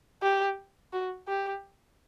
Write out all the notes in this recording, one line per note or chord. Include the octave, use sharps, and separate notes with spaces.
G4
F#4
G4